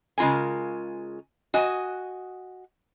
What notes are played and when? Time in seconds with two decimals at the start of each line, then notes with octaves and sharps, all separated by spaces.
0.18 C#3 G#3 F4 A#4 G#5
1.54 F#4 D#5 G#5